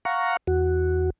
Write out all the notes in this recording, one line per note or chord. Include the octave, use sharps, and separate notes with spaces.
F5 F#5 A#5 C#6
E2 F#4